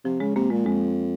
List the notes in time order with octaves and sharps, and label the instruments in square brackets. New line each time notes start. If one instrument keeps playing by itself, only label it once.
[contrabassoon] C3 [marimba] F3
[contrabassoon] C#3 [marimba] G#3
[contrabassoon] C3 [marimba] A#3
[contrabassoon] A#2 [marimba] G#3
[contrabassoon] F2 [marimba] G#3